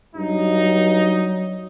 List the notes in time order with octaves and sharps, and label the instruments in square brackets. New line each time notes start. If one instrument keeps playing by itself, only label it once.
[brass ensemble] G2 D#4 [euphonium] F#3